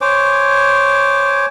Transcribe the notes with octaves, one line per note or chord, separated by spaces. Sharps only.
C5 C#5 G#5 D6